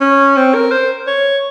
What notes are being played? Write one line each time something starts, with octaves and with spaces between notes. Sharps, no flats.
C#4
C4
A#4
C5
C#5